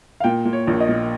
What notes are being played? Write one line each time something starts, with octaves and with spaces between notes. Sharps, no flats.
F5
A#2 G5
A#2
C#5
A#1
D#5
A#2